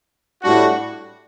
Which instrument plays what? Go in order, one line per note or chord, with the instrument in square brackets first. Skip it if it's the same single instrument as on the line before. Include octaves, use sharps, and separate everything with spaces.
[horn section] A2 G3 D4 F#4